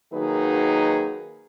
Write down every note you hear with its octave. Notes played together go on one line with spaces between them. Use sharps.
D#3 F#3 A#3 D#4 G#4 B4